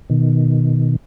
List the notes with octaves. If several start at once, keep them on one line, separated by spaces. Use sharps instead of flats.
B2 D#3